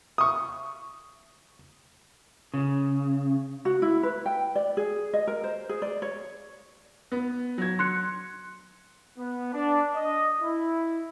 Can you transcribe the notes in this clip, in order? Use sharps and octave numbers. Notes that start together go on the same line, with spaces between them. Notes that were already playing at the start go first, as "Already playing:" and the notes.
C#6 D#6
C#3
F#4
E4
B4
G5
D5
G#4
D#5
A#4
C5
G#4
D5
C#5
B3
F#3 G#6
C6 F#6 C#7
B3
D4
D#5
E4